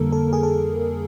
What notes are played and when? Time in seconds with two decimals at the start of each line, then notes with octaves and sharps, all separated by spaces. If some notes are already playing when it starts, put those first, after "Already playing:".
Already playing: F2 D3 G3 A#3 A4 A#4
0.12 A4
0.33 G#4
0.43 A4